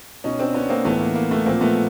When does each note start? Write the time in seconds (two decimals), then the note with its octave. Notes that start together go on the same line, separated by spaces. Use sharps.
0.24 B2 C#4 D#4
0.39 C4 D4
0.54 B3 C#4
0.69 A#3 C4
0.85 A2 E3 A3 B3
1.00 A#3
1.15 A#3
1.31 A3 B3
1.46 A#2 F3 A#3 C4
1.61 A3 B3